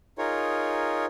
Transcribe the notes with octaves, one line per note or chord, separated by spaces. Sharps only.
D#4 F4 G#4 A#4 C#5